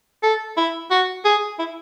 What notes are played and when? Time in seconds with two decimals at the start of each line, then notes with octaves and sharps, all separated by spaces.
0.23 A4
0.57 E4
0.91 F#4
1.25 G#4
1.59 E4